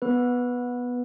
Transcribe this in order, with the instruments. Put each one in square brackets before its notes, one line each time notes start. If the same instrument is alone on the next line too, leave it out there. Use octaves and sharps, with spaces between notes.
[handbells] B3 B4